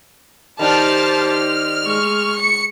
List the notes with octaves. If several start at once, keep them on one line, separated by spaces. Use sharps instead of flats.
D#3 D4 G4 C5 A5 F6
F6
G#3 C#6
C#7